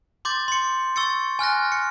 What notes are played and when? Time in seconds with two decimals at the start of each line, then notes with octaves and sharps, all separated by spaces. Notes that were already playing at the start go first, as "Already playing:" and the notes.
0.25 C6 D6 G6 A6
0.48 C6 C#7
0.96 C#6 E6 A6 C#7
1.39 G#5 F6 F#6 A#6
1.72 C#7